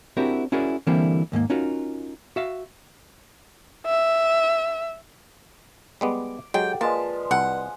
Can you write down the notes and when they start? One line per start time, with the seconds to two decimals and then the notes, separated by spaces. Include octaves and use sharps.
0.17 C4 D4 E4 F#4 G4 A#4
0.52 C#4 E4 F#4 G#4 A#4 D5
0.87 D3 E3 G3 A#3 C4 E4
1.32 D#2 G#2 G#3 A#3
1.50 C#4 D#4 F4 F#4 A#4
2.36 F#4 E5 F5
3.86 E5
6.01 G3 G#3 B3 D6
6.54 F#3 G#3 G4 A4 F#5 G5
6.81 F3 G#3 A#3 B4 D5 D#5 A5
7.31 C2 F#5